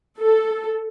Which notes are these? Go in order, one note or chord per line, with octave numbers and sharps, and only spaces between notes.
A4